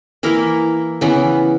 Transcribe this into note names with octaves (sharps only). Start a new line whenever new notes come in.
E3 A#3 E4 A#4
C#3 E3 B3